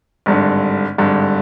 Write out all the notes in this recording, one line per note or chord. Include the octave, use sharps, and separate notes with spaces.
G#1 G2 D3
G#1 G2 D3